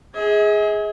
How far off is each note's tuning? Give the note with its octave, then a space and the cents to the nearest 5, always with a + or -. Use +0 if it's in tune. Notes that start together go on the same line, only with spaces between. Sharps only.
G#4 +0 D#5 +45